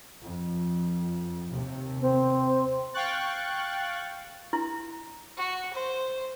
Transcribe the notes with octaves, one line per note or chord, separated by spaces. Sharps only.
F2
D#2 C3
C4
F5 G5 C#6 F#6 A6
E4
F#4
C5